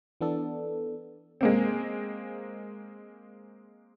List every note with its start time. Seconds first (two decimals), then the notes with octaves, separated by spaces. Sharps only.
0.21 E3 B3 D4 A4
1.41 G#3 A#3 C4